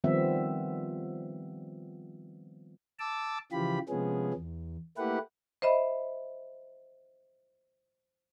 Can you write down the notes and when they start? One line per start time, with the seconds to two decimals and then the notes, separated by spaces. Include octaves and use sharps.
0.04 D#3 F3 G3 B3 C4 E5
2.99 A5 D6 E6
3.52 C#3 E3 F3 F4 G4 B5
3.89 C3 F3 G#3 B3 C#4 G#4
4.33 E2
4.98 A3 A#3 E4 G4 B4 F#5
5.62 C5 D#5 E5 B5